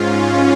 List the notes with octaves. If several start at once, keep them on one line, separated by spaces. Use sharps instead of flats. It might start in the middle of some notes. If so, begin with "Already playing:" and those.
Already playing: G#2 C#4 F4